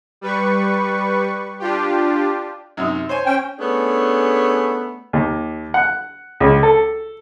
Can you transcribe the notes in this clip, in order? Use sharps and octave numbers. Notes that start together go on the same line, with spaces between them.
G3 B4 C#6
D4 F4 G4
F#2 C3 D#4
C5 C#5 G#5
C#4 G5
A3 B3 C#4 D4 G#4
D#2
F#5
C#2
A4